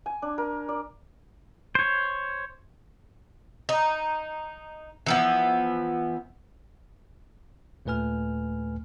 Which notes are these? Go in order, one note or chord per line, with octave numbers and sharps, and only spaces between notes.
G#5
D4
A#4
D5
C5 C#5
D#4
E3 F3 B3
D#2 A#2 A3 B4 G#5 F6